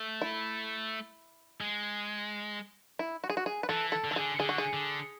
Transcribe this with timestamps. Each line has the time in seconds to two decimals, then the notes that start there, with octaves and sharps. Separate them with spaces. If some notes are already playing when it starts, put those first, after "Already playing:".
Already playing: A3
0.22 E4
1.61 G#3
2.99 E4
3.24 F#4
3.30 G#4
3.37 F#4
3.46 G#4
3.63 B4
3.69 E3 A4
3.92 A4
4.04 D3
4.11 E3 A4
4.16 D3 G#4
4.39 D3 G#4
4.49 F#4
4.58 G#4
4.73 D3